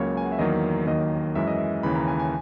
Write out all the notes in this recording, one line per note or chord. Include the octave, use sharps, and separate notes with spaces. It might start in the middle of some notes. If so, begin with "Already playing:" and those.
Already playing: C#2 C#3 F#3 A#3 C#5
G#5
F#5
E5
E2 D#3 F#3 A#3 D#5
D#2 D#3 F#3 A#3 D#5
F#2 E3 G#3 E5
D#5
E5
D#2 C#3 E3 B5
A#5
G#5
G#5